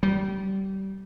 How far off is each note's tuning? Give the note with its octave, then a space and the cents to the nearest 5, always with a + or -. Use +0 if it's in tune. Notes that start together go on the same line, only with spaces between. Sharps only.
G3 -25